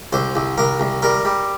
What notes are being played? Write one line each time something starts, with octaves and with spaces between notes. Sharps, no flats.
C2 C5
C2
C2 A#4
C2
G3 A#4
G3